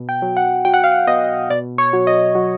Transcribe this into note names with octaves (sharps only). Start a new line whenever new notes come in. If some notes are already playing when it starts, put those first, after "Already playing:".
Already playing: B2
G5
F#3
F#5
F#3 G5
F#5
F5
F#5
B2 D#5
B2 D5
C#5
F#3
D#5
F#3